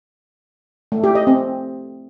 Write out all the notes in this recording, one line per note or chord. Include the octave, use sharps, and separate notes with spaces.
A3
G4
D#5
C4